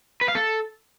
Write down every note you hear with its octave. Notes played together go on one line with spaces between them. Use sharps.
B4
F5
A4